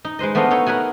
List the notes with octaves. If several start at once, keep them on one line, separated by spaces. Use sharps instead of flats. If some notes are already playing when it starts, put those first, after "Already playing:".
D#4
G#3 B4 C5 D#5
A3 B3 D4 C5 D#5 F5
D#4 A4 C#5
A#4 B4 C#5 F#5 G#5